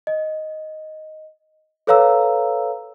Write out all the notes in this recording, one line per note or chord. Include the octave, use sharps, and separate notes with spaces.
D#5
A4 B4 C#5 F5 A#5 E6